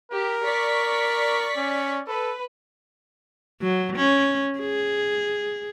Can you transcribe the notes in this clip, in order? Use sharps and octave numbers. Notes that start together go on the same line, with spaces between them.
G4 A#4
D5 C#6 B6
C#4
A4 B4
F#3
C#4
G#4